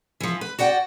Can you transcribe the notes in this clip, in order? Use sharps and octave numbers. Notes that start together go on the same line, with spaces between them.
E3 F3
B4
F#4 D5 F#5 G5